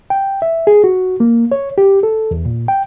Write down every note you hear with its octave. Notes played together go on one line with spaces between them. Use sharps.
G5
E5
G#4
F#4
A#3
C#5
G4
A4
E2
A#2
G5